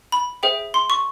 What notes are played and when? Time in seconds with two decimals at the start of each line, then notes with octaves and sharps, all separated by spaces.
0.12 B5
0.43 G#4 C5 E5 G5
0.74 C6
0.90 C#6